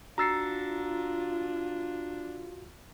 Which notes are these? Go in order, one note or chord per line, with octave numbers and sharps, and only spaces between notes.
D4 F4 F#4 A#5 E6 A6 C7 C#7